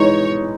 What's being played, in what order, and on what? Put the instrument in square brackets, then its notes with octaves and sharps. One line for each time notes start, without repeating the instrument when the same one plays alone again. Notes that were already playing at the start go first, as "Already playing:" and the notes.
Already playing: [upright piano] E3 G#3 D#4 [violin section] C#5